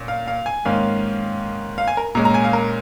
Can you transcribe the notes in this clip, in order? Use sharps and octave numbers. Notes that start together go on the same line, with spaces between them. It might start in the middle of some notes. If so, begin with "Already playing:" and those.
Already playing: A#2 C#4
F5
F5
G#5
G#2 D#3 A#3 C#4 F5
F5
G#5
A#4
A#2 G#3 C#4 A#5
A#5
G#5
F5
A#4